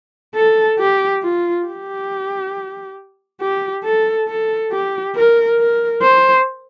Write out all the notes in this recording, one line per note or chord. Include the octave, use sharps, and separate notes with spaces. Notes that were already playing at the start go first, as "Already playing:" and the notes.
A4
G4
F4
G4
G4
A4
A4
G4
A#4
A#4
C5